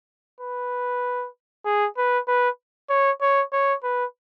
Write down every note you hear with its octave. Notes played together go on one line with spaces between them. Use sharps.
B4
G#4
B4
B4
C#5
C#5
C#5
B4